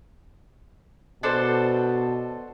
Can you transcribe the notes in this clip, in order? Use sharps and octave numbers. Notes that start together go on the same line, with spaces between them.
B2 D4 A4 C5